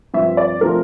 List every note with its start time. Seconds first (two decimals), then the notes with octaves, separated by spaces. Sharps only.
0.14 G2 F3 C4 E5
0.37 D5
0.61 D3 F3 A3 C4 A#4